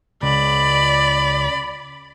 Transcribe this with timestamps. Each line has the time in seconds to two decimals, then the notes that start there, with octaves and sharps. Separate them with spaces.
0.23 C#2 D5 B5